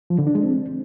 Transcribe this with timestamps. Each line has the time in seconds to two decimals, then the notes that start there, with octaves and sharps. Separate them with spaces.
0.10 F3
0.18 D3
0.27 D4
0.35 G#3
0.43 C4